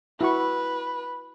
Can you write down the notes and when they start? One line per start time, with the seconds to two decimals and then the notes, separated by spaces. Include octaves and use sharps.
0.21 E4 F#4 B4 C#6